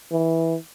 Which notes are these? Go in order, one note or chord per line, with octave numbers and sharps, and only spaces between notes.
E3